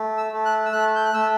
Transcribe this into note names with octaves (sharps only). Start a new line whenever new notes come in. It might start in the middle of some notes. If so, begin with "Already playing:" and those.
Already playing: A3
E6
A3
F#6
E6
A3 F#6
G6
F#6
A3 E6